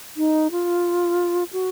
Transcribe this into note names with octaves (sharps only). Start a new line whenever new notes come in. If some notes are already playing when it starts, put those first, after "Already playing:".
D#4
F4
F#4